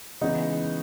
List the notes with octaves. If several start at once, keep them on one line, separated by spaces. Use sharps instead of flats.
C#3 E3 G#3 B3 D#4